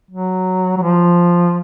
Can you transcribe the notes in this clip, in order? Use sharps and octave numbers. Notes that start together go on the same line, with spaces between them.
F#3
F#3
F3